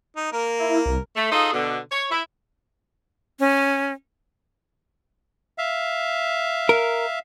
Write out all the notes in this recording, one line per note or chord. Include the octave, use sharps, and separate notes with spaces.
D#4
A#3 A#4
E4
C2
A3
D#4 F4 G#4 A4 C5
B2 D3
C#5
E4
C#4
E5 F5
A#4